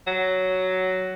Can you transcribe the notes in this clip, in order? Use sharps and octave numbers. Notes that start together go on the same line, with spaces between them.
F#3